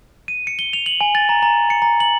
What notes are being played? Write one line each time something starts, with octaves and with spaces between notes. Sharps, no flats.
D#7
C#7
G7
F7
F#7
G#5
A6
A#5
A#5
C#7
A#5
F#7